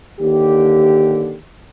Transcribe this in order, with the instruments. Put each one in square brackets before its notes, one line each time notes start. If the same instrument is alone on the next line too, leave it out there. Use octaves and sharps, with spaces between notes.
[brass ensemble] D#2 D3 G4